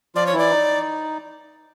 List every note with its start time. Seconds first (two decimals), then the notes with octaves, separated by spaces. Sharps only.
0.15 F3 F4 D5
0.26 C#5
0.34 E3 E4
0.39 D5
0.50 D#4